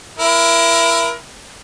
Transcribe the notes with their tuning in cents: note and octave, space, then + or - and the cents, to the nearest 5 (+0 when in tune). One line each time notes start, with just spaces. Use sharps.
E4 +25 A#4 +30